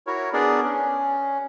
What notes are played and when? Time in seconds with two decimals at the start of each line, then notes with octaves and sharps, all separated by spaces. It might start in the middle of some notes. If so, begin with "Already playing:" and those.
0.07 E4 F#4 A#4 C#5
0.33 B3 D4 G#4 A#4 D5
0.64 C#4